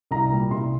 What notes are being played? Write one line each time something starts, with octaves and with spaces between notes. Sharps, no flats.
C2 A#5
A#2 G3
C2 C6